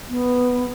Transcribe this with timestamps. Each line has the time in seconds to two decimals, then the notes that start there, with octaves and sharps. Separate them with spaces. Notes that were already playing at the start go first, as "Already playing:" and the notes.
0.09 B3